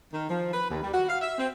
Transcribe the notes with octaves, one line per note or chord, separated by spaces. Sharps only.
D#3
F3
B4
D#2
G3
F#4
F5
E5
C4